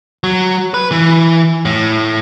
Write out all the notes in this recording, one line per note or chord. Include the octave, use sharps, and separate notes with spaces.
F#3
B4
E3
A2